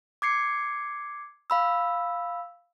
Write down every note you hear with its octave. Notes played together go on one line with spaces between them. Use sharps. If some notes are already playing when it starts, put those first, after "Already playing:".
D6 G#6 C7 C#7
F5 B5 E6